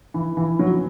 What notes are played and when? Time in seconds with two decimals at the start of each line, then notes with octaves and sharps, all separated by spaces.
0.14 E3
0.37 E3
0.59 F#3